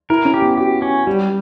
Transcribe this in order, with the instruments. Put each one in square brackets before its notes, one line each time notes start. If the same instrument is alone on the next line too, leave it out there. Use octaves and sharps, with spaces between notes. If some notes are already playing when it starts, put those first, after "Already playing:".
[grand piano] E4 [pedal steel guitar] A#4
[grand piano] C#4
[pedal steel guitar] G4
[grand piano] B3
[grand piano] F#4 [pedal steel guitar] G4
[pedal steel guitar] C#4
[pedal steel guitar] G3 [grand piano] G4